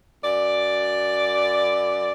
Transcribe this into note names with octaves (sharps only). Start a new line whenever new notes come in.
F#2 D5